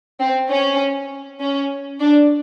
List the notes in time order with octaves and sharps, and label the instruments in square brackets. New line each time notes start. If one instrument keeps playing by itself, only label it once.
[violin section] C4
C#4
C#4
D4